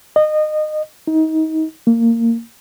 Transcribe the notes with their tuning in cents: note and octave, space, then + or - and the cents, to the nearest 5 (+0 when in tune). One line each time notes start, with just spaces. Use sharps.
D#5 -25
D#4 +30
A#3 -20